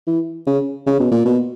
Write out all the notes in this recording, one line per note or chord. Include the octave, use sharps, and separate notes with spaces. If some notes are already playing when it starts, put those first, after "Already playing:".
E3
C#3
C#3
B2
A#2
B2